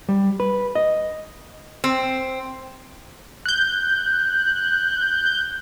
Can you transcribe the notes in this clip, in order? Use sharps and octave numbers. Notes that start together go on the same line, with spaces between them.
G3
B4
D#5
C4
F#6 G6